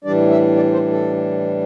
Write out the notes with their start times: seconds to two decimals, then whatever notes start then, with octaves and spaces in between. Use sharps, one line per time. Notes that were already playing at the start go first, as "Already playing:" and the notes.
0.04 A2 E3 G3 D4 D5
0.30 E5
0.56 D5
0.73 C5
0.91 A4